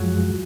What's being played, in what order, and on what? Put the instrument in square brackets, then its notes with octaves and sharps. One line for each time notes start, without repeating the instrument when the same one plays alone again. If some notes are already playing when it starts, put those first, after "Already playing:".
Already playing: [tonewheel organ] F#2 F3 G#3 [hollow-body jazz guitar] F#3